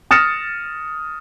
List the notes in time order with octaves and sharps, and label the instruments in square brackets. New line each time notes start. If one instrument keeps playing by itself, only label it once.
[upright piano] D#6 F6 A6 A#6 C#7 E7